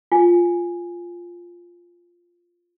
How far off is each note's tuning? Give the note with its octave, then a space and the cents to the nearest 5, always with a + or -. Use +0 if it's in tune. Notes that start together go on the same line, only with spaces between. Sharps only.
F4 +0 G#5 +0